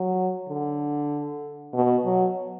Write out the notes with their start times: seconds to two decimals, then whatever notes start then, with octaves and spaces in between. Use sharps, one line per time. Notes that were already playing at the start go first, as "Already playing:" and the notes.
Already playing: F#3
0.49 D3
1.74 B2
2.05 F#3